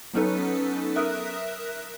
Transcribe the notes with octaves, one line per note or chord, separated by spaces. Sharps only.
F#3 B3 C#4 D#4 A4 B4
A#4 E5 D#6 F#6